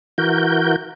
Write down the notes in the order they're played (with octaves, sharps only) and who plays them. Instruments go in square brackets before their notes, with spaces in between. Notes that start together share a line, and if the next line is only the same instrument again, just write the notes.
[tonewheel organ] E3 F#4 A#4 G6